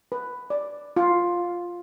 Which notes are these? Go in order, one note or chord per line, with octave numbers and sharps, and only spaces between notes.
B4
D5
F4